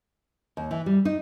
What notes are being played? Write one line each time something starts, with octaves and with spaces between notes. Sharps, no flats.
D#2
E3
G3
D#4